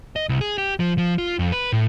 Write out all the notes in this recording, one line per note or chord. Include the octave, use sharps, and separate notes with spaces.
D#5
C2
G#4
G4
F3
F3
F4
F2
B4
A2